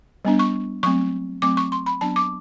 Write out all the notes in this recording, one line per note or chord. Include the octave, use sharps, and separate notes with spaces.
G3 B3 D4
C#6
F#3 A3 C4 C#6
F#3 A3 C4 D6
C#6
C6
B5
F#3 B3 D4 A5
D6